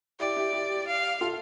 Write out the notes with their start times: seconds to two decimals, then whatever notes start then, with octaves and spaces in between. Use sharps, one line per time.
0.20 E4 G4 D5
0.36 E4 G4
0.53 E4 G4
0.87 F5
1.21 F4 A4